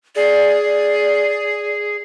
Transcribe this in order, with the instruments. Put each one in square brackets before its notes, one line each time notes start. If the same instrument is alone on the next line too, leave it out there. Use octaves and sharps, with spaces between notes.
[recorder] G#4 [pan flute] D5